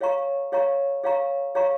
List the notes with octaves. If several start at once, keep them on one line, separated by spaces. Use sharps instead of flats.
G#4 C#5 F5 A#5 C#6
G#4 C#5 F5 A#5 C#6
G#4 C#5 F5 A#5 C#6
G#4 C#5 F5 A#5 C#6